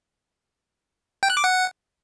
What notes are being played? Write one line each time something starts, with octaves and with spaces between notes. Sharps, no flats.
G5
F#6
D6
F#5